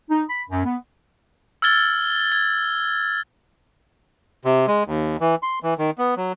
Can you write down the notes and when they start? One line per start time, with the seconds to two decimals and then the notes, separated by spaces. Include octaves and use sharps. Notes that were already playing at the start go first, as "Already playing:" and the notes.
0.10 D#4
0.30 B5
0.50 F#2
0.65 B3
1.62 E6 F6 G#6 A6 G7
2.32 G#6
4.45 C3
4.68 G#3
4.87 D#2
5.21 E3
5.43 C6
5.63 E3
5.79 D#3
5.98 B3
6.17 F#3